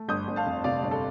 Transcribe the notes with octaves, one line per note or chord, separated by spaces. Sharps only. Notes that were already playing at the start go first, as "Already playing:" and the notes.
Already playing: A3
G1 D#6 G6
G1
F5 A5
F2
C3 D5 F5
G1
A4